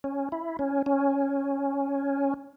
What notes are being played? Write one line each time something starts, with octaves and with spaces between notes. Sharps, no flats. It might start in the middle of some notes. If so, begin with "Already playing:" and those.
C#4
E4
C#4
C#4